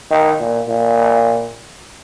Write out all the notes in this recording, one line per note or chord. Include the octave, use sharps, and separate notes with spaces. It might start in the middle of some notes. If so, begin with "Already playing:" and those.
D#3
A#2
A#2